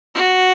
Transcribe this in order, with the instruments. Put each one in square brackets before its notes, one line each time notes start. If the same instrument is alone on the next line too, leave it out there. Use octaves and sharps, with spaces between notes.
[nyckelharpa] F#4